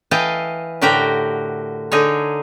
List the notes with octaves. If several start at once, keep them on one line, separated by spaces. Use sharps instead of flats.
E3 D#5 F5 G5 A5
A2 D3 F#4 G4 A#4 G5
D3 D#4 G#4 C#5